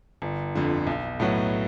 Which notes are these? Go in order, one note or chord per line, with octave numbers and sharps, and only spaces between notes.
G1
F2 D3
B1
A2 F#3 B3